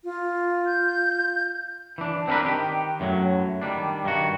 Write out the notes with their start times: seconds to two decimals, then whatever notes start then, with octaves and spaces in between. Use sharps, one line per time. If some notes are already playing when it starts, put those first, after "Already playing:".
0.04 F4
0.67 G6
1.98 E3 D4
2.27 C4 D4 F#4 A#4 B4
2.46 D#3 G4
3.00 F#2 A2 D3 F#3
3.62 D#3 G3 D4
4.04 G2 D#3 F#4